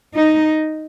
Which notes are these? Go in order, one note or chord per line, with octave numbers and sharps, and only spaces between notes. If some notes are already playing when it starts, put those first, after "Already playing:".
D#4